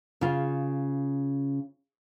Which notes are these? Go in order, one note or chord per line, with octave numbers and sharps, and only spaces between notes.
C#3 F4